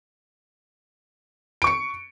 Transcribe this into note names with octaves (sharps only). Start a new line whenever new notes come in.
C#6 C#7 D7